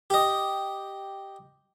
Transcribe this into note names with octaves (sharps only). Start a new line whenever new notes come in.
G4 D#5